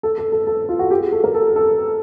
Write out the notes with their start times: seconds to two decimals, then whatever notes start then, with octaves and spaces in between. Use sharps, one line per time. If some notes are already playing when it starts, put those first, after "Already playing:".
0.03 A4
0.18 A4
0.32 A4
0.47 A4
0.69 F4
0.79 F#4
0.90 G4
1.01 G#4
1.12 A4
1.24 A#4
1.34 A4
1.56 A4